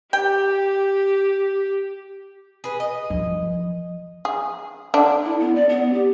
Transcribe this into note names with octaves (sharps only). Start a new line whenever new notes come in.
G4 G5
G#4 B4
D#5
F3
G#4
D3 D4
E4
B3
D5
B3
G4